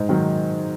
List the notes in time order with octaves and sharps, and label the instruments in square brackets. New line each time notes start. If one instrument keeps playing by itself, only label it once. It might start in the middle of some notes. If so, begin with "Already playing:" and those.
Already playing: [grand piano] G#2
D#3 F#3